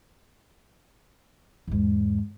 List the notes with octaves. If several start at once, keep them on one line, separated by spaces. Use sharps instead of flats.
E2 G#2